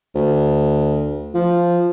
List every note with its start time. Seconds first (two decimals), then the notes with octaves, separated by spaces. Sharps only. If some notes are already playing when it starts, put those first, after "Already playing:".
0.15 D2
1.34 F3